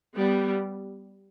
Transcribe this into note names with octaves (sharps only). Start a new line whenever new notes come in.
G3 B3